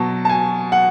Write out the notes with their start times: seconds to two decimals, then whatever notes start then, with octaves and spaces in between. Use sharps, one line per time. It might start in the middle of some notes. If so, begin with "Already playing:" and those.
Already playing: B2 F#3 A5 C#6
0.25 A5
0.29 G#5
0.72 F#5